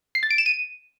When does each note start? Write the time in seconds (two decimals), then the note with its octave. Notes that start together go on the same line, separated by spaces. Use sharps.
0.15 C7
0.23 A6
0.31 D7
0.38 E7
0.46 D#7